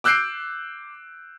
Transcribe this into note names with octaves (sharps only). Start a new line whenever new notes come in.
D6 E6 F#6 G6 C7 D7